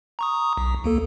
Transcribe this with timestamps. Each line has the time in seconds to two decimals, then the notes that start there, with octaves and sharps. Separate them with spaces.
0.19 A#5 C#6 D#6
0.58 B1
0.84 D2 A#3 A4